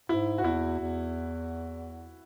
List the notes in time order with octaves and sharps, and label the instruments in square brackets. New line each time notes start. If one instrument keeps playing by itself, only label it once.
[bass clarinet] G#2 [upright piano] E4
[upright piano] F#4
[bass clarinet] E2 [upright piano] E4
[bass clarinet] E2